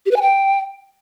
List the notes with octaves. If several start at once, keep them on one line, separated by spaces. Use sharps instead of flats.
G4
B4
G#5
G5